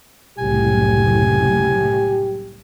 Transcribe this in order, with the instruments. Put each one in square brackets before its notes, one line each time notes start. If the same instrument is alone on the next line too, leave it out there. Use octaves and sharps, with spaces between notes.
[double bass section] F#1 C2 [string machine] A2 [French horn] G4 [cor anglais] G#5